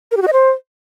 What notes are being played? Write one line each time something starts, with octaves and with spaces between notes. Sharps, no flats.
A#4
G4
F#4
D#5
C5